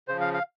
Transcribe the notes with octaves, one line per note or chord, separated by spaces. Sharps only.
C#3 F3 C5
F5
F5